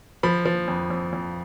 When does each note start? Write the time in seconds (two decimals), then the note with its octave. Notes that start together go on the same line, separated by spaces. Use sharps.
0.23 F3 B5
0.45 F3
0.68 F2
0.90 F2
1.13 F2